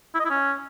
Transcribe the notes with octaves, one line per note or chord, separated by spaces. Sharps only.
E4
D#5
E4
C#4